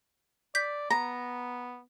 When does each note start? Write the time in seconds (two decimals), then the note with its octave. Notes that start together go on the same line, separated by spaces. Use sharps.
0.55 D5 G6 B6
0.90 B3 A#5